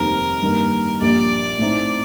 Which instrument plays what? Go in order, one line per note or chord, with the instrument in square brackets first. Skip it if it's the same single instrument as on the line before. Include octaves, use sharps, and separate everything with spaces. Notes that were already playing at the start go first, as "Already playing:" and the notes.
Already playing: [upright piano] F1 D#2 D#3 G3 C4 [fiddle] A#4
[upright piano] G2 D#3 A#3
[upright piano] A#1 A#2 G3 [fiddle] D5
[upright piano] A2 A3 C4 D#4